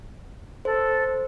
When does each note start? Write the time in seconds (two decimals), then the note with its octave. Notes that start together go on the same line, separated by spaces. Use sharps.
0.65 A4 C5